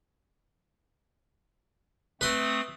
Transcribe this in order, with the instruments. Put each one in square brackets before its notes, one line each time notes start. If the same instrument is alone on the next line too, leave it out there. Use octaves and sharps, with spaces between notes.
[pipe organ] A3 C4 D#6 [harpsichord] B4 C6